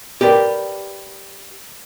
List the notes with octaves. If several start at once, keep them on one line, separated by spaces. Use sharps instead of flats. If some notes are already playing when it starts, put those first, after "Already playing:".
G4 A#4 B4 D5